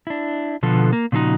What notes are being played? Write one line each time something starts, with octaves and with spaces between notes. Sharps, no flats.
D4 E4
B2 D3 F3 B3 A4
A#3
A#2 C#3 F3 G#3 D#4 F#4